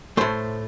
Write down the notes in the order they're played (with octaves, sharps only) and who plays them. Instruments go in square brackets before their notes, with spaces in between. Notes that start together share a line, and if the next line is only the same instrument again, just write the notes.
[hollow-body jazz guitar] A2 A3 C5